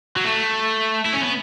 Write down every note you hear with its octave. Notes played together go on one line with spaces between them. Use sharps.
F#3
A3
E4
C#4
B3